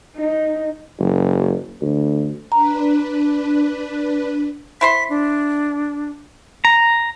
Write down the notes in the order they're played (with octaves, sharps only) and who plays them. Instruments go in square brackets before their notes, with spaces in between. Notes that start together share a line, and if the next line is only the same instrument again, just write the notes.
[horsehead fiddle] D#4
[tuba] F#1
D2
[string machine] D4 B4 [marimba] A#5
[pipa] E4 C5 C6 [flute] B6
[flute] D4
[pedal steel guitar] A#5